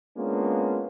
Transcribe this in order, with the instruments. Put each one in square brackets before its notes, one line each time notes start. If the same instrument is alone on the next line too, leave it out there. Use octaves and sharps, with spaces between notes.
[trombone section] G#3 A#3 B3 C#4 D4 F4